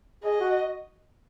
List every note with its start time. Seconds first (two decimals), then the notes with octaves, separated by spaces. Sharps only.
0.24 G#4 D#5
0.40 F#4